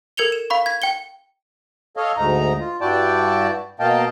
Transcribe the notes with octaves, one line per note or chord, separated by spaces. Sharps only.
A4 A#4 G#6 C#7 F7 G7
E7
F5 B5 C#6
G#6 B6
G5 C#7 G7
A4 C#5 D#5 F5
D2 G#2 D#4 A#5
F4
G2 E4 F#4 D5 G5 A5
B2 A#3 D#5 F5 G5 A5